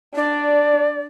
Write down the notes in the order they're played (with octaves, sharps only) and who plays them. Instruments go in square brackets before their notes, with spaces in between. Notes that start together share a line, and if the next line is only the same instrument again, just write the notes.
[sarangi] D4 [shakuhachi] D5